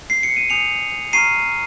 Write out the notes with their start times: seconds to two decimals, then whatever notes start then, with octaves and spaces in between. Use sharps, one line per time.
0.10 C7
0.23 C#7
0.37 D#7
0.50 G#5 D#6 G6 C#7 F7
1.13 A#5 C#6 F6 C7 D#7